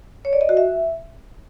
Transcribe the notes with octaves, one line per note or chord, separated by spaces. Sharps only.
C#5
D5
D#5
F#4
E5